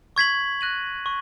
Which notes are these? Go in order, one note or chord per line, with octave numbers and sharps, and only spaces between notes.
C#6 G#6 B6 F#7
F#6 A#6 D#7 F#7
C#6